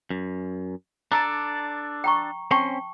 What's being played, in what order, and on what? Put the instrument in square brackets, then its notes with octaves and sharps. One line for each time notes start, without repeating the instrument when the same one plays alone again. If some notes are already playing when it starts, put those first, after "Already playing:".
[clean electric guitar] F#2
[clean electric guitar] D4 A4 D5 [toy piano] A#5
[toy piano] G5 A#5 C#6
[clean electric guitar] C4 C#4 C6 [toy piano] G5 A5 C#6